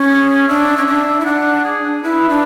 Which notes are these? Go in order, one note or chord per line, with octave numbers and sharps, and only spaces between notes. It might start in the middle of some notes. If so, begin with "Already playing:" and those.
Already playing: C#4
G#4
D4 E5
C#4
D4
E4
D4 F#5
G#4
E4 B4
D4